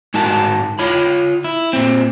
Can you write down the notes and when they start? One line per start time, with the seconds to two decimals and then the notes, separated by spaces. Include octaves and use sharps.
0.14 G#2 G#3 F#4 A#4 A5
0.79 F4 C#5 B5
1.44 E4
1.73 A#2 C4